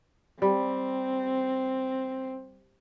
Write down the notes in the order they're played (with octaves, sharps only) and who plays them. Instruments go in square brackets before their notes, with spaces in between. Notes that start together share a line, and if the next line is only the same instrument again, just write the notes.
[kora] G3 [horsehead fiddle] C4